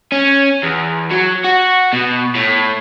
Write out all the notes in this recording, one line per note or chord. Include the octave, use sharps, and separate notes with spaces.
C#4
E2
F#3
F#4
B2
A2